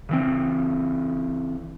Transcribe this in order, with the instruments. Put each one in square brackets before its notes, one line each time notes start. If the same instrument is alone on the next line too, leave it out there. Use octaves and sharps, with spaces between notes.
[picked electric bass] C#3 E3 C4